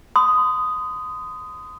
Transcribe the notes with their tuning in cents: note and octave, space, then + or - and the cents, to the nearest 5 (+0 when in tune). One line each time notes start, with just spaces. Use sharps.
C6 -40 D#6 +0